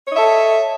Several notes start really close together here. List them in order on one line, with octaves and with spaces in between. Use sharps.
C#5 D#5 E5 A4